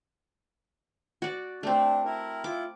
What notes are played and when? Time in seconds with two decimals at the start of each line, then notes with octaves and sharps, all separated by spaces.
1.22 F#4 D5
1.63 A3 C4 D4
2.05 E4 A#4
2.44 E4 F4 D6